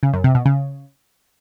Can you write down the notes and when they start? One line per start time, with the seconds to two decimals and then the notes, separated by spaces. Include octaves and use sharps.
0.03 C#3
0.13 F#2
0.24 C3
0.35 B2
0.46 C#3